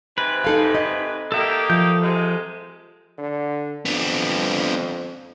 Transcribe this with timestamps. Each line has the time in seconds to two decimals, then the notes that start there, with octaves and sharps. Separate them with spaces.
0.18 G#2 C3 B4
0.44 D#4 A4 F5
0.75 D#5
1.32 A#3 D#4 G4 A4 E5
1.70 F3 A4 G6
2.01 C3 G#3
3.18 D3
3.86 F2 B3 D4